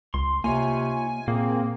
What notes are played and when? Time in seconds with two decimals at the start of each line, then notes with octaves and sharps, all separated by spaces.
0.14 C#2 C6
0.44 C3 A#3 D#4 F4 C#5 G#5
1.28 A#2 A#3 C4 G#4